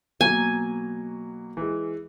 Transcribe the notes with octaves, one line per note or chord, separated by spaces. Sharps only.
B2 F#3 A#3 G#5
E3 G#3